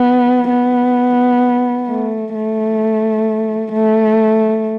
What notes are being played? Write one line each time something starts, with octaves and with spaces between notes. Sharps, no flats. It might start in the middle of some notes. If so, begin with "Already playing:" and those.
Already playing: B3
B3
A3
A3
A3